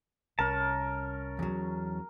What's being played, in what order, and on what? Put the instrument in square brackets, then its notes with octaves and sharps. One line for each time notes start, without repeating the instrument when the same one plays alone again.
[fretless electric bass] C2 [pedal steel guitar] C#4 A5 [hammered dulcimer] A#4
[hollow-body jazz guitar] E2 F#3